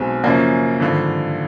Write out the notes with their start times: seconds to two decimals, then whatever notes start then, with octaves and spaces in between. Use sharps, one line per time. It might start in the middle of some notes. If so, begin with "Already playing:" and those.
Already playing: B1 B2 G#3 C4
0.24 F#2 C#3 F3 A#3
0.80 G#1 G2 D3 F3